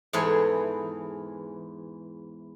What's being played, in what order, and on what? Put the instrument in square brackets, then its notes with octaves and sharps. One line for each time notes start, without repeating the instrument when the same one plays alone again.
[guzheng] E2 G#2 E3 G#4 A4 B4